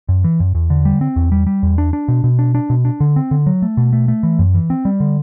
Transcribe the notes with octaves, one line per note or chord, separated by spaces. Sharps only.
F#2
E3
F#2
E2
D3
G3
C4
E2
G3
G3
E2
D4
D4
B2
B2
D4
D4
B2
D4
D3
C4
D3
F#3
A3
B2
A3
A3
E3
F#2
E3
C4
G3
D3